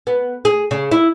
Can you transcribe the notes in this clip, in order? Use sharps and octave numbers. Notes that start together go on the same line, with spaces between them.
B3
G#4
C#3
E4